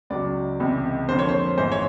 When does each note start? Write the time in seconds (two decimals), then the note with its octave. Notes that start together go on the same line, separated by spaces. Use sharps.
0.10 C#2 C#3 F#3 D5
0.59 C#2 C3 E3
1.08 F2 D3 F3 A#3 C5
1.19 C#5
1.29 C5
1.58 A1 G#2 E3 C5
1.72 C#5